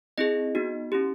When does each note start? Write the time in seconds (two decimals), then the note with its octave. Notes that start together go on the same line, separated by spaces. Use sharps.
0.18 C4 E4 G#4 D#5
0.55 B3 D#4 F#4
0.92 C#4 E4 G4